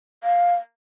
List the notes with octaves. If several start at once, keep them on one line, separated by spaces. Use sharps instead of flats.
F5